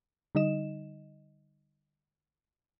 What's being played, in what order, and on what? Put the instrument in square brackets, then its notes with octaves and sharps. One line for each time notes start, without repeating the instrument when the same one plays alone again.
[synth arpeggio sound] D3 G3 D#4 D#5 E7